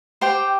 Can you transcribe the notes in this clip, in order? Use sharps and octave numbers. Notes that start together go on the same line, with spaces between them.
G4 C5 G5